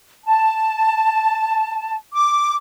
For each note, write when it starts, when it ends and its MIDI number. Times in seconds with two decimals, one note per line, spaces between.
0.24 1.96 81
2.14 2.55 86